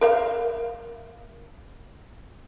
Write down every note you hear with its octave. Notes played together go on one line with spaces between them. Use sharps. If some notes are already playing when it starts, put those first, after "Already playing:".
A#4 E5 F5